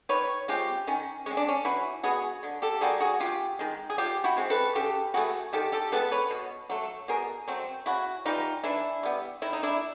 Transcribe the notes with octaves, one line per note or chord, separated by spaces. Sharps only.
D#3 B4 C#5
G#3 C4 F4 G4
D#3 C#4
G#3 C4 C#4
D4
C#4
E3 E4 F#4
G#3 B3 F#4 G#4
D3
G4 A4
G3 A#3 F#4 G#4
F#4 G#4
C3 F4 G4
D#3 G#3
G#4
F3 F4 G4
E4 F#4
G#3 C4
A4 B4
C#3 G4 A4
E3 A3 F#4 G#4
D#3 G4 A4
G4 A4
G#3 B3 A4 B4
B4 C#5
B2
F#3 A3
B2 G#4 A#4
F#3 A3 C4
C#3 E4 F#4
E3 G3 D#4 F4
E3 D4 E4
G3 B3
D#3 E4
D#4
D4 E4